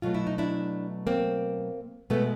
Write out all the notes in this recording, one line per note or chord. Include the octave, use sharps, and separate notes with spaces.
B2 F#3 A3 F4
E4
D#4
D4 E4
A#3 C4
B2 G#3 A3 B3